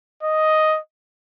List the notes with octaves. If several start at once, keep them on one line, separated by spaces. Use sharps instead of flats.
D#5